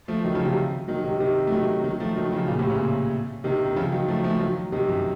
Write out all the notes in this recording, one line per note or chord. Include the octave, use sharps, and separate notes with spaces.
F3 A3
D#3 F#3
C#3 F3
C3 D#3
D#3 F#3
C3 D#3
C3 D#3
A3
D#3 F#3
D#3 F#3
F3 A3
D#3 F#3
C#3 F3
A#2 C#3
A2 C3
A#2 C#3
C3 D#3
D#3
C#3 F3
D#3 F#3
F3 A3
F3 A3
D#3 F#3
C3 D#3
F#2